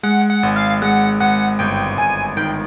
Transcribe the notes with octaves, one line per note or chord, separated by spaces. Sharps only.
G#3 F#5
F#5
G#1
F5
G#3 F#5
G#1 F#5
G1 G5
G1 G#5
D#3 G5